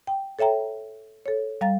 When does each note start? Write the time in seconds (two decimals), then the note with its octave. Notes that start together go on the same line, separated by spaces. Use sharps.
0.07 G5
0.39 A4 C#5 E5 G5 A#5
1.26 A4 C#5
1.61 G3 F5 A#5 A6